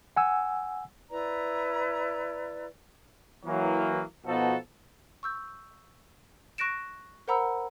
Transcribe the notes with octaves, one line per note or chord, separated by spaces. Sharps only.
F#5 G#5 E6
E4 B4 D5 A#5
E3 F#3 A#3
B2 F3 B3 D#4 F#4 A4
C#6 E6 G6
C#6 F#6 A#6 D7 E7
A#4 C5 F#5 A#5 B5 E6